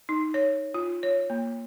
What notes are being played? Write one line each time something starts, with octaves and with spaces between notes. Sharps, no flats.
D#4
C#5
F4
C#5
A#3